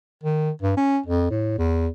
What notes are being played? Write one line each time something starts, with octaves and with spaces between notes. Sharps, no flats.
D#3
G2
C#4
F2
A2
E2